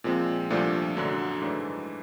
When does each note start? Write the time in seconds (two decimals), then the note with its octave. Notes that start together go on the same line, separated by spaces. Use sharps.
0.04 A#2 F3 G#3 C4
0.50 C2 A#2 F3 A3 D4
0.97 F#2 D3 F#3
1.42 G#2 E3 A3 D4